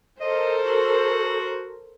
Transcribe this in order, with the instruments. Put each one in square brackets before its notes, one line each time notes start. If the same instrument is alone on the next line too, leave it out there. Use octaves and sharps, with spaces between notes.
[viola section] A4 A#4 C5 [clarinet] D#5
[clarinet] F#4